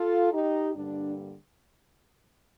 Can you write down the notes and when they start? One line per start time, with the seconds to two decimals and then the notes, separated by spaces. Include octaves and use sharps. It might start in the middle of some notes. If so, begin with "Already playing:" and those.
Already playing: F4 A4
0.32 D#4 G4
0.74 G2 D3 G3 A#3 D4